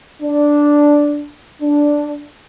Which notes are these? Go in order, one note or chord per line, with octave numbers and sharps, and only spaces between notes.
D4
D4